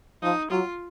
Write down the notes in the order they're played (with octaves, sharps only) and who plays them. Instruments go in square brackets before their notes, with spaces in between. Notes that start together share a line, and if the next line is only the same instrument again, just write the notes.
[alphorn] F3 [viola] D#4
[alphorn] F#3 [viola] F4